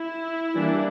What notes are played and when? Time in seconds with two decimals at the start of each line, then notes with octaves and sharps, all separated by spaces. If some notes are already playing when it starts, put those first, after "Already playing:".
Already playing: E4
0.54 E3 G3 A#3 D4